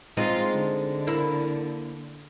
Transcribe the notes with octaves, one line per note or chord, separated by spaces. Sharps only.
G#3 C4 D#4 F4
D3
A#3 E4